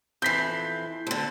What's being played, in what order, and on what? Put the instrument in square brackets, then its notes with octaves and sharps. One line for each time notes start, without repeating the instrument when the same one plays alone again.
[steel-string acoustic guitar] F2 E3 [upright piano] G6 B6 C7
[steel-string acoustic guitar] D2 D3